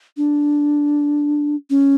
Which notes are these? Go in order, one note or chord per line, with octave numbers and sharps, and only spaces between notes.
D4
C#4